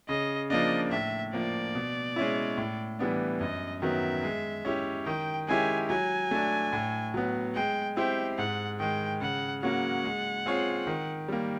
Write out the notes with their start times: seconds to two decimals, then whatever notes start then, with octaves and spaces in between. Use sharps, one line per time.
0.09 C#3 D#5
0.50 F3 A#3 D4 D#5
0.91 A2 E5
1.33 F3 A#3 D5
1.75 B2
2.16 G#3 C#4 E4
2.57 A2
2.99 E3 G3 B3 D4
3.40 F#2 D#5
3.82 D#3 F#3 B3 E5
4.23 G#3
4.65 C#4 E4 G4
5.06 D#3 G5
5.48 G#3 C#4 E4 G4 G#5
5.89 F#3 G#5
6.31 A3 D4
6.73 A2
7.14 F#3 B3
7.55 G#3 G5
7.97 C4 E4 G4 C5 G5
8.38 G#2 F#5
8.79 D#3 G#3 G5
9.21 C#3 F#5
9.63 F#3 A#3 C#4 F#4 F#5
10.04 G#3
10.46 C4 F4 G#4 C#5
10.87 D#3
11.28 G3 A#3